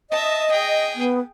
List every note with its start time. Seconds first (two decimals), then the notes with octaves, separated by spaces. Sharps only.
0.11 D#5 E5 A5
0.51 G#4 G5
0.94 B3